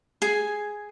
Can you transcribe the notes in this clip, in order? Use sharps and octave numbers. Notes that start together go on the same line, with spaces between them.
G#4 G#5